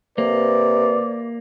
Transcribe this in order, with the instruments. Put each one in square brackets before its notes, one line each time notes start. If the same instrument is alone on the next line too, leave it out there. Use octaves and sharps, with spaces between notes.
[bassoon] C3 [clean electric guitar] A#3 [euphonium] B4 [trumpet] D5